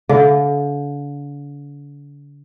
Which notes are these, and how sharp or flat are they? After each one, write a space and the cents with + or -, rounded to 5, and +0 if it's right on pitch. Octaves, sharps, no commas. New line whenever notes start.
D3 -40 F5 -35